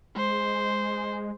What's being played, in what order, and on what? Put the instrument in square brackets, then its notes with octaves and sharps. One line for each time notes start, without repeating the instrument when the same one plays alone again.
[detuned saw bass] G#3 [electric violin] C5